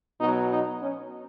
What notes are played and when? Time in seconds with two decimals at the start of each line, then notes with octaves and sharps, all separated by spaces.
0.21 B2 F#3 D#4
0.51 D#4
0.82 C#4